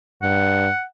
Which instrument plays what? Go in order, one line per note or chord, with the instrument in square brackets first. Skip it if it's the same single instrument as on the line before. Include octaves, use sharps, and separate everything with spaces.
[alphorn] G2 [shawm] F#5